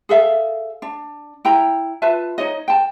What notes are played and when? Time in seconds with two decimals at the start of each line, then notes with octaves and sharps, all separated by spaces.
0.09 G#4 A4 E5 F5
0.82 D4
1.45 E4 G5 A#5
2.02 F4 B4 E5 A5
2.38 D#4 C#5 D#5
2.68 G5 A5